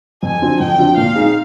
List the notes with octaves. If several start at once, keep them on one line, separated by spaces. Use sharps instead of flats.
F2 G#5
D3 F3 C4
F2 G5
D3 F3 C4
A#2 F5
G#3 C4 D#4 G#4